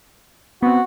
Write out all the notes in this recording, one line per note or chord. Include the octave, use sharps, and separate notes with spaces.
B3 C4 F#4